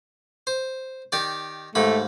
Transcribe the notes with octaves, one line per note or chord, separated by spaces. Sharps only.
C5
D#3 G4 D5
D#2 G#2 A3 B5